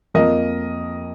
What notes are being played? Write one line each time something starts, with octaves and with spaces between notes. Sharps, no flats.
F2 F3 A#3 A#4 D#5